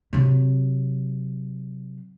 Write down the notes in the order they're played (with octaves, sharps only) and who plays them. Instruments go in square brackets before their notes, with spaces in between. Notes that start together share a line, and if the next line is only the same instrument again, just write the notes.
[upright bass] C3 F#3